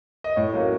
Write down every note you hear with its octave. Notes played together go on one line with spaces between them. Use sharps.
D#5
A2 C#5
F#3 A#3 C#4